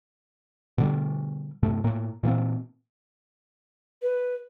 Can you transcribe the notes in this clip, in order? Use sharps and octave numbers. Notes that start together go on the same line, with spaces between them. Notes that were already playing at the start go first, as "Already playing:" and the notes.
B2 D3 G3
G2 C3 A3
A2 A#3
A#2 E3 A#3 C4
B4